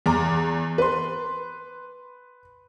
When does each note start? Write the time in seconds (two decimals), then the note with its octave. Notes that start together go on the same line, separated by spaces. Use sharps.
0.06 E2 A#5 D6
0.78 B4 C6